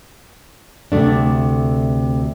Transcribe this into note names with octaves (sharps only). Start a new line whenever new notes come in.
D2 C3 A3 D4